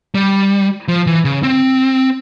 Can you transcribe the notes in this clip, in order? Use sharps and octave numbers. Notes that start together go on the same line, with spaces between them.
G3
F3
E3
C#3
C4